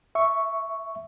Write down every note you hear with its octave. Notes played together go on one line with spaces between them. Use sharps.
E5 C#6